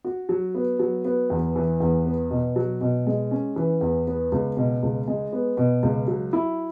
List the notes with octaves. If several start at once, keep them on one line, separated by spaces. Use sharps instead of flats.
F#4
F#3
B3
F#3
B3
E2
E3
E2
B3
B2
F#3
B2
G#3
C#4
E3
E2
B3
C#2
B2
C#2
G#3
B3
B2
C#2
F#3
E4